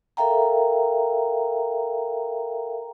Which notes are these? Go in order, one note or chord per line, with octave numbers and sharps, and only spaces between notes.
A4 A#4 E5 F5 G5 A#5